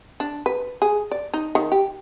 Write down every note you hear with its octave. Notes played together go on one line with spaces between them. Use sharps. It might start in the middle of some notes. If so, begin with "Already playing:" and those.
D4
B4
G#4
D5
D#4
D#3
G4